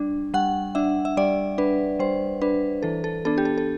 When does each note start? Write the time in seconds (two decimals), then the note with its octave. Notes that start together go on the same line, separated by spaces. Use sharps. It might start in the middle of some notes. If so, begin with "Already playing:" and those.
Already playing: G3 D4
0.34 G3 F#5
0.75 D4 E5
1.05 E5
1.17 G3 D5
1.58 D4 B4
1.99 G3 C5
2.42 D4 B4
2.83 E3 A4
3.04 A4
3.25 B3 D4 A4
3.38 G4
3.45 A4
3.58 A4